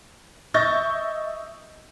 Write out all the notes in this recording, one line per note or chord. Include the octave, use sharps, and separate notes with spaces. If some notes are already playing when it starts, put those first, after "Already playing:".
D#5 E5 C#6 G6 A6 A#6